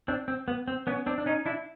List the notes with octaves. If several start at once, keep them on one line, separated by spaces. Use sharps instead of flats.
C4 D4
C4
B3
C4
B3 C#4
C4 D4
D4
C#4 D#4
D4 E4